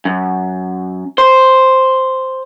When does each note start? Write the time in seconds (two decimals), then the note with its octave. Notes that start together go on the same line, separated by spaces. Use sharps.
0.05 F#2
1.18 C5